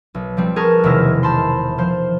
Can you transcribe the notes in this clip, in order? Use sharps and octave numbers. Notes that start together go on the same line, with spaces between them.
B1
F3 G3 C4
G#4 A#4 B4 A5 C#6 F6
E1 C3 D#3 E4 F6 A#6
C5 A5 B5 C6
F3 C5